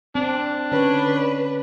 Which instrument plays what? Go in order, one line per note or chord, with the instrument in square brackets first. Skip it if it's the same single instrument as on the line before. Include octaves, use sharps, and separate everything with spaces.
[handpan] C4 [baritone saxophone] D4
[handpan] D3 C#4 C#5 [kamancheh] B4